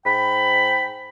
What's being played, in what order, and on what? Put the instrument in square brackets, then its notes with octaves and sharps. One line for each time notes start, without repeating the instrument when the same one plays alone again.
[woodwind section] G#2 G5 B5